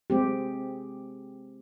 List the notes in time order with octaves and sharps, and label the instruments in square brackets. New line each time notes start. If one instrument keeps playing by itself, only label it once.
[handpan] G#3 C4 G4